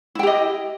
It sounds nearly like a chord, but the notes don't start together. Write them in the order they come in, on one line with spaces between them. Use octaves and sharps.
E4 G5 G4 D#5